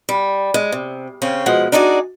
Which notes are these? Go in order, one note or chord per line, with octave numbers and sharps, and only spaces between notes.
G3
G#3
C3
C#3 C4 C#4
B2 F3 G#3 F#5
D4 D#4 F#4 G#4 D5